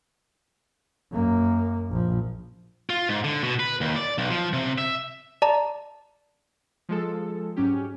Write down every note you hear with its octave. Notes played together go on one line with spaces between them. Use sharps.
F#2 A#3
A#1 F3
F4
G#2
D3
B2
B4
D#2
D5
B1
F3
C3
E5
D5 A5 A#5
F3 G#3 A4
G#2 F#3 C#4 G4